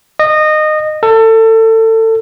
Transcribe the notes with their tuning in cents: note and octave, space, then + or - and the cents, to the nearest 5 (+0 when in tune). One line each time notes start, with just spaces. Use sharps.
D#5 -20
A4 +25